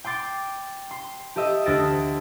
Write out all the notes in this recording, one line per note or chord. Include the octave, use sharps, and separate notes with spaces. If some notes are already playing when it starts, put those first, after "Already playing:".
G5 C6 D6 A6
C6
G4 A4 D#5 E5
D2 A4 E5 A6 A#6 D7